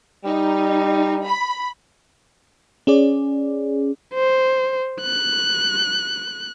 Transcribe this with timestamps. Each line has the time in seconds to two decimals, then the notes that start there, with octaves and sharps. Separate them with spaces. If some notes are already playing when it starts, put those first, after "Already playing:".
0.25 G3 D#4
1.24 B5
2.87 C#4 G#4 D5
4.14 C5
5.02 F#6